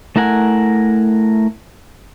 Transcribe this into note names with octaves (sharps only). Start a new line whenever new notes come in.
A3 E4 A#4 F#5 G#5